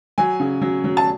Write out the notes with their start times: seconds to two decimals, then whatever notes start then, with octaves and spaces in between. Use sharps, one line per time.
0.18 F#3 G#5
0.40 C#3
0.62 F#3
0.84 F#3
0.97 A5